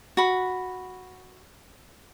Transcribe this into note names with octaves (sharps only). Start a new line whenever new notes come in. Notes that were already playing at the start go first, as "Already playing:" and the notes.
F#4 B5